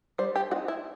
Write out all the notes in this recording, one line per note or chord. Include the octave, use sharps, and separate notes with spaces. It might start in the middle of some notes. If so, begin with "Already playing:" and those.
G3 C5
G4
C4 D#4 F#4
E4